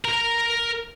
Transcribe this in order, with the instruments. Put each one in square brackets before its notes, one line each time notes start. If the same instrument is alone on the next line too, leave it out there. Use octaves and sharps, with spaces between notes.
[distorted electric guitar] A#4 A#5